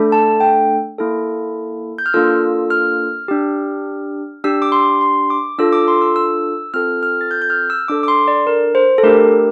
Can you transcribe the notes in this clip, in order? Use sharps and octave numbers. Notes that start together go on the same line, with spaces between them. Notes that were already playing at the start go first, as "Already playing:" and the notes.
Already playing: A3 D4 A4
A5
G5
A#3 E4 A4
G6
F6
A#3 D4 F4 A4 E6
F6
D4 G4
D4 G4 E6
D6
C6
C6
D6
D4 F4 A4 E6
D6
C6
E6
E6
C4 F4 A4 F6
F6
A6
G6
G6
F6
E6
D4 A4 D6
D6
C6
D5
A#4
C5
A4
A3 D4 G4 A#4